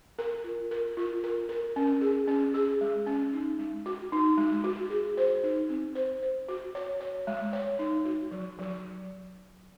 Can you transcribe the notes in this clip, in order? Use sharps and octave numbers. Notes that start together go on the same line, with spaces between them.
A#4
F4
A#4
F4
A#4
A#4
C#4
G#4
C#4
G#4
G#3
C#4
D#4
G#3
F#4
D#4
G#3
F#4
G#4
C5
D#4
C4
C5
C5
F#4
C#5
C#5
G#3
C#5
D#4
F#4
F#3
F#3